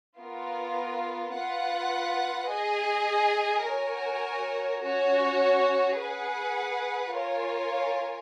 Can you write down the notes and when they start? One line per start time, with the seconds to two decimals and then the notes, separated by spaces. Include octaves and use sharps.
0.19 B3 F4 A#4
1.35 F4 B4 F#5
2.51 G#4 D#5 G#5
3.67 F#4 A#4 C#5 G#5
4.82 C#4 F#4 C#5
5.99 G#4 B4 F#5
7.14 F4 A#4 C#5 G#5